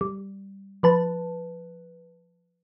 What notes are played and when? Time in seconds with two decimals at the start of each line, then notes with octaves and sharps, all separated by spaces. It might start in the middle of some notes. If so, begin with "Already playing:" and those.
0.01 G3
0.83 F3 B4 A5